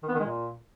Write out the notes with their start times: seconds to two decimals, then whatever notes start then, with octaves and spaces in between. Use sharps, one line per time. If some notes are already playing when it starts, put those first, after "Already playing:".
0.03 D#3
0.09 B3
0.14 D#3
0.20 G#3
0.25 A#2